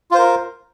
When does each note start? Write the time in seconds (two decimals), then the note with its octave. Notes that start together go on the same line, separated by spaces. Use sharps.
0.11 F4
0.15 C5
0.18 A#4